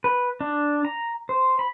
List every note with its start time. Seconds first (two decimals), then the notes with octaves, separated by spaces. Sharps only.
0.04 B4
0.41 D4
0.85 A#5
1.29 C5
1.59 B5